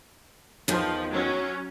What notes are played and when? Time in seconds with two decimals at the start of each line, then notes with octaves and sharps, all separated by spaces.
0.68 E2 D#3 F3
1.12 F#3 C#4